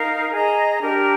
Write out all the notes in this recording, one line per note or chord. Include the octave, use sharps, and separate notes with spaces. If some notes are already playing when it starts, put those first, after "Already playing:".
Already playing: D#4 A#4 F5
G#4 D#5 A#5
D4 G4 A#4